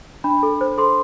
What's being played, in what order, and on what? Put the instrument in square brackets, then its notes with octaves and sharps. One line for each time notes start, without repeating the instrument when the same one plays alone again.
[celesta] D4 B5
A4
C5
A4 C6